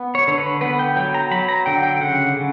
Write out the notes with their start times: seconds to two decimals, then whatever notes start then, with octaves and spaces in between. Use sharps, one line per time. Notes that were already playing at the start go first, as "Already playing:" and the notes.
Already playing: B3
0.15 C#5
0.27 D3 C#5
0.38 B4
0.61 B3 B4
0.79 G5
0.96 F#3 G5
1.14 A#5
1.31 F#3 B5
1.49 A#5
1.66 D3 G5
1.83 G5
2.00 C#3 F#5
2.36 C#3